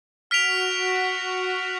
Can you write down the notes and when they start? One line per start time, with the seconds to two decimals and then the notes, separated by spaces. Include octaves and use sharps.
0.30 F#4 F6 B6 D7 F7